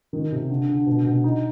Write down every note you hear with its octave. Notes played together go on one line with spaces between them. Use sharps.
D#3
C3
D3
D3
B2
B2
D#4